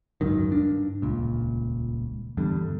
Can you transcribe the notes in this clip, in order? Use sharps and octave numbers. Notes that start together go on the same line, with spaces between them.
G#1 C#2 F#2 D#3
G2 D4
D#1 C#2 A#2
E2 G2 D3